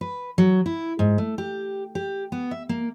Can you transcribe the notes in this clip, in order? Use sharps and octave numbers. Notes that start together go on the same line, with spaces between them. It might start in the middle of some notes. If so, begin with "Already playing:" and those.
B4
F#3
E4
G#2
A3
G4
G4
B3
E5
A#3